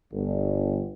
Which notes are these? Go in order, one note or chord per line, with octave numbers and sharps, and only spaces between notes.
G1